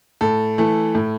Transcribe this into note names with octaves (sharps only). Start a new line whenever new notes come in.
A2 A4
E3 A3
A2